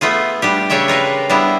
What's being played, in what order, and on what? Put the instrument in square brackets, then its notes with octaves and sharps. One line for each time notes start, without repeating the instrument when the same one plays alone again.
[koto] A3 B3 F4 G#4
G3 D4 G4
C#3 D4 C#5 E5 G5
F4 A#4 B4 F5
G3 B3 D4 E4